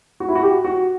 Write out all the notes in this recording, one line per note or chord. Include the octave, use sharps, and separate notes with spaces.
F#4
E4
F#4
G4
F#4